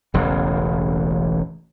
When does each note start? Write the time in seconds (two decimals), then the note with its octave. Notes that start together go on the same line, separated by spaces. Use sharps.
0.14 E1 A1 E2 C#3